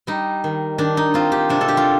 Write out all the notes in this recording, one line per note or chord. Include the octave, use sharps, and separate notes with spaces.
G3 D#4
D#3
D#3 D4
D#4
C4 F4
G4
C3 D4
A4
G4
F4